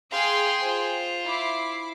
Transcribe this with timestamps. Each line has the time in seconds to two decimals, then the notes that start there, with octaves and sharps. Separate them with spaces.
0.12 G#4 F5 G5 C6
0.62 F4 C5
1.26 E4 D6 C7